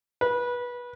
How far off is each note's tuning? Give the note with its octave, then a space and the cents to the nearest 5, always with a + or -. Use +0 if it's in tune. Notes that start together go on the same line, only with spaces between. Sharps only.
B4 -20